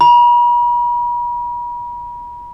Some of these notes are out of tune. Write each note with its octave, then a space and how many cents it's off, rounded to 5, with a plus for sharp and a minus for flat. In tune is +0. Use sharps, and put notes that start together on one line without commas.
B5 -45